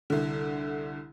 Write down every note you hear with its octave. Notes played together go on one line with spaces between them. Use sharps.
C2 D3